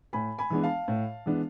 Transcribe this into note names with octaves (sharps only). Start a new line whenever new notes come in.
A2 G#5 B5
G#5 B5
E3 G#3 B3 D4
F5 A5
A2
E3 G#3 B3 D4